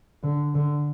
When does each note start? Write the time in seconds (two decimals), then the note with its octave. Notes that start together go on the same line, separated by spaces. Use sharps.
0.23 D3
0.55 D3